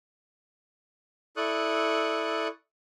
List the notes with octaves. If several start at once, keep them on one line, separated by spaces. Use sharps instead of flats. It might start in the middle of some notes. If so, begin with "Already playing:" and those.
E4 A4 D5 C#6 D#6 F#6